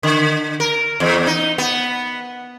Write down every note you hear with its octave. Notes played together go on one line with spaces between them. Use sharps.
D3
A#4
E2
D#4
B3